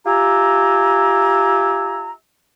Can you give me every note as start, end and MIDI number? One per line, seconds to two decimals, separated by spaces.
0.06 2.12 65
0.06 2.12 67
0.06 2.12 76
0.06 2.12 80
0.06 2.12 82